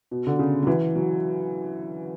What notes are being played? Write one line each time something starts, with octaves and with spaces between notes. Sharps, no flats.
B2
D3
C#3
F#3
E3
F#3